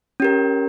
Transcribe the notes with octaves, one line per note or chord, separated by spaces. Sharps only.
C#4 G4 A#4